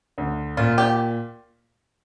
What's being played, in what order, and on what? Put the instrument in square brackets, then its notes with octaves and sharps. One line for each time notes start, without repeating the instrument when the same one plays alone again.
[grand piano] D2
[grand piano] A#2 [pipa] F4
[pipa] G4